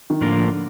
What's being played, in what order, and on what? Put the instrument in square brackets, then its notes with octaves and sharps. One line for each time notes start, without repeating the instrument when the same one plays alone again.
[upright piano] D#3
[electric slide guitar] A2 F3 A#3 F4 A#4 [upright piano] D3